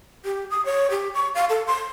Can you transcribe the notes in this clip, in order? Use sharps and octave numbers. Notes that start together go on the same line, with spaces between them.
G4
D#6
C#5
G4
C#6
F5
A4
C6